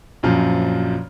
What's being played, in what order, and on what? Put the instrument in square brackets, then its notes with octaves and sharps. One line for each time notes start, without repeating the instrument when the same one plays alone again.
[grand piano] A#1 F#2 F3 F6